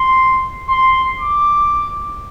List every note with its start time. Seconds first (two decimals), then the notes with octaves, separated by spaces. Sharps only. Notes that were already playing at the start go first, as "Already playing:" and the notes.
Already playing: C6
0.69 C6
1.20 D6